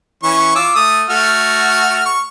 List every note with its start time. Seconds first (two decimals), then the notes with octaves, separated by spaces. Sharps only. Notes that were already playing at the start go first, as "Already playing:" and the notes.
0.23 E3 C#4 C#6
0.55 F4 D6 E6
0.75 A3 D#6
1.10 A3 F#4 F6
2.06 C#6